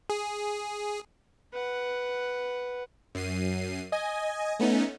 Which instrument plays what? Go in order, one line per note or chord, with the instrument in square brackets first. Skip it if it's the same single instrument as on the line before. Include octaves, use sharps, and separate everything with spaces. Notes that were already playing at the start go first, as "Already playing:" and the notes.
[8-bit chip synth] G#4
[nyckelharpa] B4 F#5
[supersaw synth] F#2 C7 D#7
D#5 G#5
A3 B3 C#4 D#4